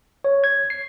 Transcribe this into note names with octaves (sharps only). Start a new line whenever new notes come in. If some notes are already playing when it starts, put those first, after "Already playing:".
C#5
G#6
C7